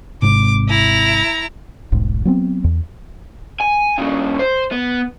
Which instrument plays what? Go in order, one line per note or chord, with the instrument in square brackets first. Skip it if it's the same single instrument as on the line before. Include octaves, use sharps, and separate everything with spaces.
[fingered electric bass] G#1 G#2 C3 [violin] D6
[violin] E4 A#5
[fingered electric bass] D#1 B1 G#2
F#3 B3 C4
E2
[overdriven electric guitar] G#5
G2 C#3
C5
B3